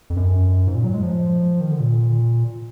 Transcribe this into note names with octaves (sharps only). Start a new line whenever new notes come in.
F2
F#2
G#2
A#2
F#3
G#3
F3
D#3
D3
A#2